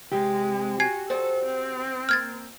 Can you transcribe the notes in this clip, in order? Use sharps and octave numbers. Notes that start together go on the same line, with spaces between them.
C3 G#3 C4 G4
F#4 G#5 G#6 C7
F#4 A4 C5 D5
C4
A#3 F6 G#6 A6